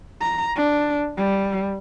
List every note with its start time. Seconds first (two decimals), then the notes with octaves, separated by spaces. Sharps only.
0.22 A#5
0.56 D4
1.18 G3